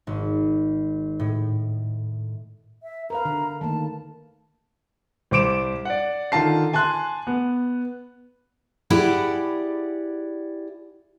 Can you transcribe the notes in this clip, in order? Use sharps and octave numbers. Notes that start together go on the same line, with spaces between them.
G#1
A2
E5
A#4 B4 F5 A#5
D3
D#3 A3 A#3 A5
C2 C5 D6 D7 E7
D5 F#5
D3 D#3 F4 A5 C7
G#5 A5 C6 F#6
B3
E4 G4 G#4 D5 F#5